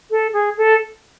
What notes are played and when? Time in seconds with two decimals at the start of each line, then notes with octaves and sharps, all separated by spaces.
0.10 A4
0.33 G#4
0.57 A4